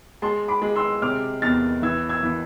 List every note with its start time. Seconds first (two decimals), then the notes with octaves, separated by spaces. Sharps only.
0.22 G#3 A5 C6
0.48 B5 D6
0.62 G#3
0.76 C6 E6
1.02 C3 D6 F6
1.42 E2 F6 A6
1.82 E3 E6 G#6
2.09 E6 G#6
2.23 E3